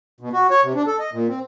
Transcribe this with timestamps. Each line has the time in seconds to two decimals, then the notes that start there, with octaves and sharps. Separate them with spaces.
0.21 B2
0.33 F#4
0.51 C#5
0.63 C3
0.75 D4
0.87 A4
0.99 D#5
1.13 A#2
1.28 C4